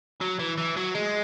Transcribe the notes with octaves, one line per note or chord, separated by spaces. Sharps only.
F#3
E3
E3
F#3
G#3